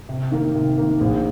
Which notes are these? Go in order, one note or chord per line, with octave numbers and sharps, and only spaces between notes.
C3
D#3 A#3
C3
D#3 A#3
A#1